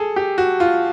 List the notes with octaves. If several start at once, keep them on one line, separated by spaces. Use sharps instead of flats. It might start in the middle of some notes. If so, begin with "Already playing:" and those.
Already playing: G#4 A4
G4
F#4
F4